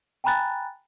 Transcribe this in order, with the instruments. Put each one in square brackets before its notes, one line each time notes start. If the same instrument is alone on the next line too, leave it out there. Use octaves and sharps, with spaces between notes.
[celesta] G5 G#5 A#5 B5 F#6 A6